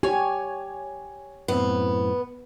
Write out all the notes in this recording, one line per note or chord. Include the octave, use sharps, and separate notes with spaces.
G4 C#5 G#5
F#2 A2 B3 C4